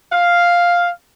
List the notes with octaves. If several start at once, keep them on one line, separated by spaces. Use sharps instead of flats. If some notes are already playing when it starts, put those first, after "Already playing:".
F5